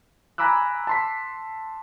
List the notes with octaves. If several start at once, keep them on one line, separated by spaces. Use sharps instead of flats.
G#5 A#5 B5 D6 E6 F#6
A5 C6 B6